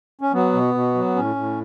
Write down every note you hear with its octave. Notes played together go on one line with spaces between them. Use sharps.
C#4
F#3 B3
B2
B2
F#3
A2 C#4
A2